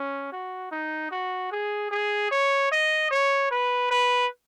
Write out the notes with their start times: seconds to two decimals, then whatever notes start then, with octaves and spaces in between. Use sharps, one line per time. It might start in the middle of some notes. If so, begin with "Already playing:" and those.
Already playing: C#4
0.32 F#4
0.71 D#4
1.11 F#4
1.52 G#4
1.91 G#4
2.31 C#5
2.72 D#5
3.11 C#5
3.51 B4
3.91 B4